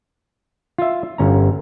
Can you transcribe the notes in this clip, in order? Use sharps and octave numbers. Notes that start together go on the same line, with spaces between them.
F4 E5
G1 C#4 A#5